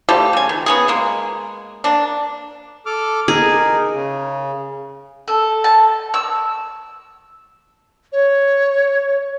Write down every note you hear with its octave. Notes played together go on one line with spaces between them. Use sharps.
F3 G3 A3 G4
C#3 G#5
D#3
B3 C#4 G#4
G#3 A#3
A#3 D4
A4 D6 F6
D#4 G#4 A#4
C#3
A4
A5
E6
C#5